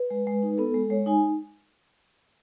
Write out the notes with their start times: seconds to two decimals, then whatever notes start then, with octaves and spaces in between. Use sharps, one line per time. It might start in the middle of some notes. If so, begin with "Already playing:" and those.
Already playing: B4
0.11 G#3
0.27 G#3
0.43 D#4
0.58 B3 A4
0.74 G#3
0.90 G#3 C#5
1.06 D#4 G#5